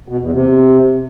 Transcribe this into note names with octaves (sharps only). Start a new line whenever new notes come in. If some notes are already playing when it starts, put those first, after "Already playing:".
B2
E2
C3